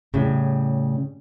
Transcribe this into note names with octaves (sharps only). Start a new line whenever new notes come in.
A2 C#3 G3